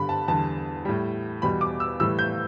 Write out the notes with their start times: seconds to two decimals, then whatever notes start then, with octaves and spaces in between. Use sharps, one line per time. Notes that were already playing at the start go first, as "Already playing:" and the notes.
Already playing: G2 D3 G3 B5
0.09 A5
0.28 E2 D3 G3 A5
0.85 A2 G3
1.42 E2 B2 G3 B5
1.61 D6
1.80 E6
2.00 A2 E3 G3 E6
2.19 G6